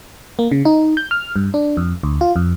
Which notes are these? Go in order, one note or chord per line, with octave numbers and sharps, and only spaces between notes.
A#3
C#3
D#4
G6
F6
G2
D4
F2
D2
F4
F2